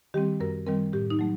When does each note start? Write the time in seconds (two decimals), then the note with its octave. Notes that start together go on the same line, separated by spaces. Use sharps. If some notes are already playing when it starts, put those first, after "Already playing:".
0.14 D#3 G3 C4 G4
0.40 F#2 A#4
0.66 D#3 G3 C4 A#4
0.93 A2 G4
1.10 D#4
1.19 F#3 A3